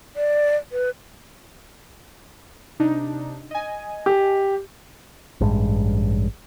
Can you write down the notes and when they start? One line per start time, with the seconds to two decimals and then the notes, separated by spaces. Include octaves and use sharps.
0.16 D5
0.72 B4
2.80 C3 D4 D#4
3.51 D#5 G#5
4.06 G4
5.41 A1 G2 G#3